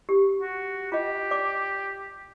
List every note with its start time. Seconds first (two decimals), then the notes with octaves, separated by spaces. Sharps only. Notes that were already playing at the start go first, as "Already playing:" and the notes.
0.09 G4
0.40 F#4
0.92 F4 G4 D#5
1.31 D5 D6